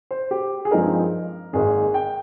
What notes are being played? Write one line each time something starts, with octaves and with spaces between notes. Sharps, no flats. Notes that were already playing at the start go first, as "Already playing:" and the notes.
C5
G4
G#4
G2 F3 G#3 C4 D#4 A#4
G#1 G#2 D#3 A#3 D#4 G#4
G5